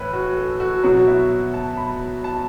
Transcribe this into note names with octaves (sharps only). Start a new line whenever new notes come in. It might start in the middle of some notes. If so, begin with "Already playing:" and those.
Already playing: A2 E3 B4
F#4
A4
F#4
B2 F#3 F#4
E4
A5
B5
A5